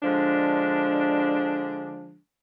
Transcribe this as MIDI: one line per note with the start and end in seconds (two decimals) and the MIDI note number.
0.03 2.18 50
0.03 2.18 53
0.03 2.18 56
0.03 2.18 62